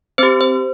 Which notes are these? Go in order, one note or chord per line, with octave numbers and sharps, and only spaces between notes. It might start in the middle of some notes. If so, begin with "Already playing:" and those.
C4 G4 C5
C5